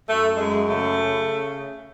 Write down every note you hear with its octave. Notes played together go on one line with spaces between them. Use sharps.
F#2 A3
F#2 G#3
C#3 A3
C#3